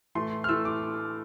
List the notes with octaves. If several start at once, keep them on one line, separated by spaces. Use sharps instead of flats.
A2 E3 A3 C6
F6
A2 E3 A3 E6
D6